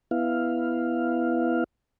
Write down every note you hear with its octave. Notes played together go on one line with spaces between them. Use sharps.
B3 E4 F5